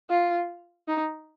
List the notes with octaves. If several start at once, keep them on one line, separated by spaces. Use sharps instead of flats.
F4
D#4